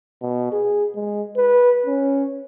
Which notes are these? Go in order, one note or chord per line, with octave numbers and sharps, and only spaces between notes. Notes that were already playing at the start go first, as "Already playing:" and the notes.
B2
G#4
G#3
B4
C#4